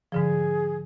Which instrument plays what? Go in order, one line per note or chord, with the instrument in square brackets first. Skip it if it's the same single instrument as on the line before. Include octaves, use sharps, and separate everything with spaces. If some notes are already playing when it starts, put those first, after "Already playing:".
[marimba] G#2 D3 F3 [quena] G#4